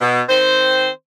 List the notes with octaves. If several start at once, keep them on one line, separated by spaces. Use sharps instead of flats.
B2
D#3 C4 C5